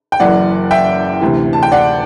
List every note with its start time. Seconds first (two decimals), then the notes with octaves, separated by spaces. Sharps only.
0.12 G5
0.20 F#1 F#2 E3 D5 F#5
0.71 E5 G5
1.21 D2 C3 E3
1.53 A5
1.63 G5
1.72 D5 F#5